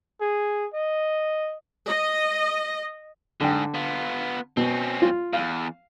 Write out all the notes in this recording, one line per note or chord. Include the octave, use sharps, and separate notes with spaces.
G#4
D#5
D#5
G#2 D3 G5
B3 F4
B2 C4 C#4
F4
E2 F5